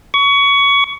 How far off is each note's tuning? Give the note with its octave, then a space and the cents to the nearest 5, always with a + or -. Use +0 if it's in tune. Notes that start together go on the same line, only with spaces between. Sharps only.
C#6 +25